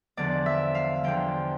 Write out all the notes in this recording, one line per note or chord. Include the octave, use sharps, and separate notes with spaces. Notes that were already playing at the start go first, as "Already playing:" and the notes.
E2 D3 F3 D5
E5
F5
E2 D3 F3 G5